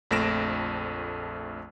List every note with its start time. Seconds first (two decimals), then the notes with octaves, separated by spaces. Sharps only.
0.11 A#1 F2 A3 A#6 D7 E7